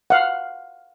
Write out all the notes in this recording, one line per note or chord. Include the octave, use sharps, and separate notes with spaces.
F5 F#5